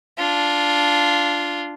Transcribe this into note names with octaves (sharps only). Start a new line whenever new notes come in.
D4 F4